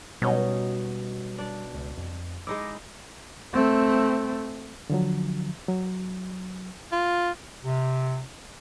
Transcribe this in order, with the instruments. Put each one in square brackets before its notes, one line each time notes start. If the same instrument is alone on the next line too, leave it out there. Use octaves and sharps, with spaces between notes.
[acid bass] B2 [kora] F#3 C#4 D#4 [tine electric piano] G3 B3
[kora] D4 D5
[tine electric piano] C#2
F2
[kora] G#3 D#4 E4 [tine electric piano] D6
[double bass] A3 C4
[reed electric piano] D3 F3 F#3
F#3
[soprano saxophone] F4
[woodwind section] C3